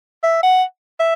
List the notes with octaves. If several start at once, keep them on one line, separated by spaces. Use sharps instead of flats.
E5
F#5
E5